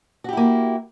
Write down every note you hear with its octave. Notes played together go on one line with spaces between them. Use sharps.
A#3 E4 F#4 G4